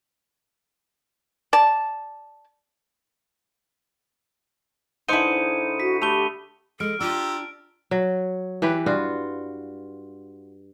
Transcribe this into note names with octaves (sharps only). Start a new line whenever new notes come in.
D5 A5
D3 D#4 E4 G#4 C5 D#6 C#7 D#7
F#4 B6
A3 G4 B5 D#7 G7
G#3 A4 F6 D7
D4 F4 G4 A#5 E6
F#3
E3 G4 B4
G2 F4 F#4